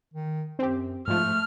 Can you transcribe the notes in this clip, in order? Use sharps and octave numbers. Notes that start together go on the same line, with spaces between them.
D#3
F#2 C4 G4
G#2 F3 A3 F6